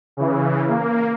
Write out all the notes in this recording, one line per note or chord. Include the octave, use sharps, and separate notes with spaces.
C#3 E3
A#3